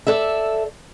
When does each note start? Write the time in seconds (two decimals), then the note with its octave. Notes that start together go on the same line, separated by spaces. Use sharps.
0.07 A4 D5 E5